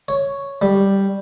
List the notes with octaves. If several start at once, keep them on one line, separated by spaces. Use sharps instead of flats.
C#5
G3